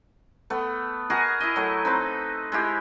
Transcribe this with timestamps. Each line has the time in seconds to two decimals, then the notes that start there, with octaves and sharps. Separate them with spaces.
0.50 A3 B3
1.10 F#4 G#4 A#4 D#5
1.40 E4 D#5
1.56 F#3 A3
1.85 C4 D#4 B4
2.52 G#3 E4 G4